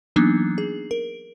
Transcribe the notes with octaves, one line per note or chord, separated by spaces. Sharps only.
E3 F#3 A#3 B3 D4 D#4
G#4
A#4